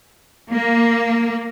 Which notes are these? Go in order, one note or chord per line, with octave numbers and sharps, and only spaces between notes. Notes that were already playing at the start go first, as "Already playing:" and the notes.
A#3